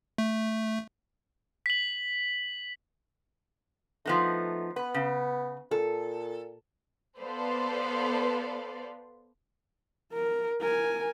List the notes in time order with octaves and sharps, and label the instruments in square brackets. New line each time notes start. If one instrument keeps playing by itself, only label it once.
[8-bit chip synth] A3
[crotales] B6 F#7
[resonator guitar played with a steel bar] F3 B3 D#4 [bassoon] A3
[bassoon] B3 [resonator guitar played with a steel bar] B4
[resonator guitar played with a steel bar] C#3
[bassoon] A#2 [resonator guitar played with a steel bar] A4
[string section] B3 A4 B4 C5 D5 F5
[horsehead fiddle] A#4
A#4 G#5